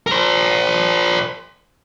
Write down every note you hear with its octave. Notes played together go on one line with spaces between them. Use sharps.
A#4 C5